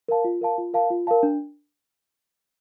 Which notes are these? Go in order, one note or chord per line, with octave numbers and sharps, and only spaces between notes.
A#4 F5 A5
F4
A#4 F5 A5
F4
A#4 F5 A5
F4
A#4 F5 A5
D4